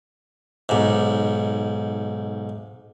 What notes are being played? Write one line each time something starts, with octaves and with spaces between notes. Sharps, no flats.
B1 G#2